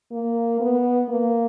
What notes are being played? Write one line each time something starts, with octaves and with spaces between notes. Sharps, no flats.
A#3
B3
A#3